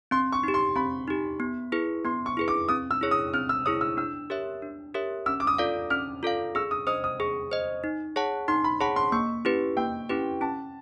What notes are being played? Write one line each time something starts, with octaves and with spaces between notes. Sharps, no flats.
C4 C6
C#6
D#4 G4
C6
C4 B5
D#4 G4
B3
E4 G#4 B4
B3 C6
C#6
E4 G#4 B4
D6
C4 D#6
E6
E4 G#4 C#5
D#6
C4 F6
E6
E4 G#4 C#5 D#6
E6
D4 E6
G4 A#4 C#5 E5
D4
G4 A#4 C#5 E5
C#4 E6
D6
D#6
F4 A4 D5 F5
C#4 F6
F4 A4 D5 F5
G#4 E6
D#6
C5 D#5 D#6
D#6
G#4 C#6
C5 D#5
D#4
G#4 C#5 F#5 A5
D#4 C6
B5
G#4 C#5 F#5 A5 B5
C6
A#3 C#6
C#4 E4 G4 B4
A#3 G5
C#4 E4 G4 B4
C#4 A5